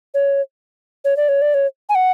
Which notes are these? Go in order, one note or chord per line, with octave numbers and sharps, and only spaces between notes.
C#5
C#5
D5
C#5
D5
C#5
G#5
F#5